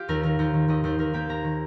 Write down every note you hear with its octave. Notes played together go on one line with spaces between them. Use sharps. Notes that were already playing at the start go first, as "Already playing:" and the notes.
Already playing: F4 G4
D#2 A#4
D#3 A#4
D#2 C5
D#3
D#2 D#5
D#2 C5
D#2 A#4
A#3 G4
A#3 A#5
D#3